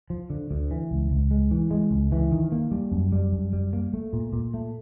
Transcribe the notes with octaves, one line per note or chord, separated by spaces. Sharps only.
F3
D3
D2
E3
C#2
C#2
G#3
E3
G#3
C#2
E3
D#3
A#3
G3
F#2
G3
F#2
G3
A#3
A3
A#2
A#2
A3